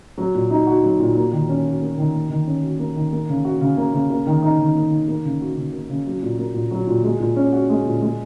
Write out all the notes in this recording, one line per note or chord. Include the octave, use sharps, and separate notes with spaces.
F#3
A#2
D#4
F#4
F#3
A#2
A#3
D#3
C#4
F#4
A#3
D#3
A#3
D#3
C#4
F#4
A#3
D#3
A#3
C#3
F#4
C#3
A#3
C#3
A#3
D#3
D#4
D#3
A#3
D#3
A#3
C#3
F#4
C#3
A#3
C#3
F#3
A#2
A#3
A#2
F#3
A#2
G#3
A#2
C#4
F#4
G#3
A#2
G#3